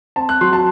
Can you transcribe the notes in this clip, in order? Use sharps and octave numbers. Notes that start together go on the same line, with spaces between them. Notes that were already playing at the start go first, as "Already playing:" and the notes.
C4 A5
F#6
F#3 C6
A5